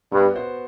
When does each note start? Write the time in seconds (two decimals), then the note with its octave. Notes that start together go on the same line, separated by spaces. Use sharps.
0.12 G2 B3
0.34 F#4 C5